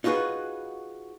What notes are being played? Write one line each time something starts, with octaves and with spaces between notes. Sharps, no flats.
D#4 F4 F#4 G#4 B4